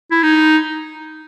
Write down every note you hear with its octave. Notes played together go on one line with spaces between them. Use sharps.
E4
D#4